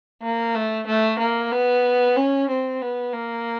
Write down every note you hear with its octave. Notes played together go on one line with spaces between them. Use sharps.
A#3
A3
A3
A#3
B3
C#4
C4
B3
A#3